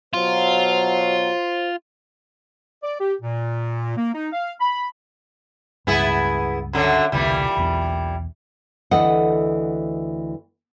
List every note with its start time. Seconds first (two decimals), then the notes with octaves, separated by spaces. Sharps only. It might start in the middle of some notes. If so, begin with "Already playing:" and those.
0.13 B2 F#3 F4 C5
2.83 D5
3.00 G4
3.21 A#2
3.97 A#3
4.14 D#4
4.33 F5
4.60 B5
5.87 C#2 G2 B3 E4 G#4
6.73 F#2 D3 F#3
7.12 E1 C2 A#2 D3 E3 G3
7.57 B1 E2
8.91 D2 E3 A4 D#5 F#5